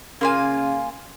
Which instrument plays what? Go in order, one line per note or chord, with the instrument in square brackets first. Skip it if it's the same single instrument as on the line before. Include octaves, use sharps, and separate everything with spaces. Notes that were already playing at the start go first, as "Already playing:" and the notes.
[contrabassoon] C#3 [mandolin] A#3 F4 G#5